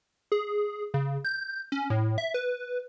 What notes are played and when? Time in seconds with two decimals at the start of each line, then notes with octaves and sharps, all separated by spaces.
0.32 G#4
0.94 C#3
1.25 G6
1.72 C#4
1.90 A2
2.18 E5
2.34 B4